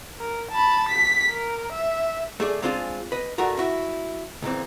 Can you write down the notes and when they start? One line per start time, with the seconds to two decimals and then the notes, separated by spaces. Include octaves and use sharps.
0.20 A#4
0.51 A5 B5
0.89 B6
1.30 A#4
1.72 E5
2.40 A3 G#4 D5
2.62 G#3 C4 D4 F4 G4 G#4
3.12 B4 D#5
3.38 G2 A3 F#4 G#4 A#4 A#5
3.58 E4 F#4 E5
4.42 C#2 A#2 E3 C4